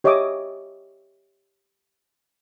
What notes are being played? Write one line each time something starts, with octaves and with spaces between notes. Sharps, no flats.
G4 C#5 D#5 E5 D6 D#6